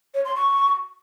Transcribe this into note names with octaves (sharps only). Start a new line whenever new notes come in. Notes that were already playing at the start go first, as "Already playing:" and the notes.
C#5
C6
C#6